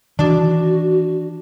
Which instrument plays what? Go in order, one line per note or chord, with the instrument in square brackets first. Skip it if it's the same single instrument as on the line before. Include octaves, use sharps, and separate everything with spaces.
[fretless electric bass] D#3 E3 [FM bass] D4 [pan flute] F#4